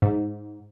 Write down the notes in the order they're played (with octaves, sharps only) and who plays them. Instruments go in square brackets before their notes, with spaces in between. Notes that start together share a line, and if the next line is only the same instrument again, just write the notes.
[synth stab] G#2